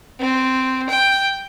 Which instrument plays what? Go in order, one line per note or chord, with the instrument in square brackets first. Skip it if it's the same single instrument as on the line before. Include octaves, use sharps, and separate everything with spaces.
[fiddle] C4
G5